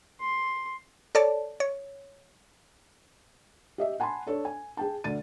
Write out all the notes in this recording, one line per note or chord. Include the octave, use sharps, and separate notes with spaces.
C6
A4 C#5 D5 A5
C#5
G4 D#5 E5
F#5 G#5 A5 B5 C6
D4 A4 C#5
G#5
G#4 G5 A5
D2 D3 A6 D#7